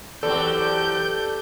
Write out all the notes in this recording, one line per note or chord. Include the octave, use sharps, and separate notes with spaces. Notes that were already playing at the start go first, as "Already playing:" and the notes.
E2 F#3 C4 G4 A4 D5 G6